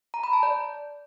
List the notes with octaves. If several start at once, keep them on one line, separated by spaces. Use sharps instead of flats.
A#5
B5
A5
D5